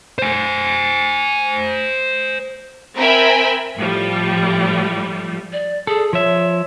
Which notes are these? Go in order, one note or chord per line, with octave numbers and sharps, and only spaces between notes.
C5 G#5
C4 A#4 E5 G5 G#5 B5
A2 F3 G3
D5
G#4 A4
F3 C#5 E5